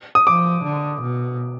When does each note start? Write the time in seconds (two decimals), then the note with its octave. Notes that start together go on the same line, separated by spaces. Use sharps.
0.15 D#6
0.27 F3 D6
0.64 D3
1.02 B2